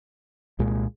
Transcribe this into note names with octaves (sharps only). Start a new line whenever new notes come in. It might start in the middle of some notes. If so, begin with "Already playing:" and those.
C2 A#2 G#3